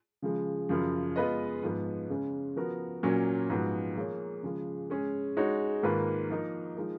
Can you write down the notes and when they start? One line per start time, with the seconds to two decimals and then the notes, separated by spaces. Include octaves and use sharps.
0.22 C#3 F3 G#3
0.69 F#2 C#3 F3
1.16 G#3 B3 F4 B4 D#5
1.63 G#2 F3 B3
2.09 C#3 G#3 C#4
2.56 F3 B3 F#4 A#4
3.03 A#2 F#3 A#3 C#4
3.50 G#2 F3 B3 F#4
3.96 F3 A#3 F4 G#4 C#5
4.43 C#3 F3 G#3
4.90 G#3 C#4 G#4
5.37 G#3 D#4 F#4 C#5
5.83 G#2 D#3 A#3 F4 B4
6.30 F3 A#3 D#4 A#4 D#5
6.76 F3 G#3 D#4 A#4